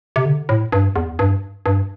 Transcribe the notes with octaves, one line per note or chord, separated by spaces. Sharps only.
C3
D3
A2
G2
E2
G2
G2